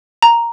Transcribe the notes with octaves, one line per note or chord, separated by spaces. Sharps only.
A#5